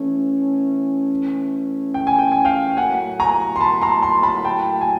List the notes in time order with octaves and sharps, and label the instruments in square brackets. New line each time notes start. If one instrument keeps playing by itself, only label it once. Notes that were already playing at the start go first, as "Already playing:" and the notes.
Already playing: [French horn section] E3 A3 C#4
[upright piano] G5
G#5
G5
G#5
F5 G5
[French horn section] A2 F#3 A#3 [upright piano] F#5 G#5
[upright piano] G#5 A#5
C6
A5 B5
A#5 C6
A#5 C6
A5 B5
G5 A5
G#5